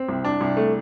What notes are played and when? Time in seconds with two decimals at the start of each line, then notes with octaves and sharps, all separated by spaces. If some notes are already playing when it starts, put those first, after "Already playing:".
Already playing: C4
0.09 C2
0.24 D4
0.41 C2
0.57 A3